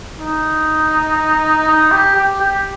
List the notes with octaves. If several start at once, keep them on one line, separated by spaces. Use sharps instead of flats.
D#4
D#4
G4
G4
G4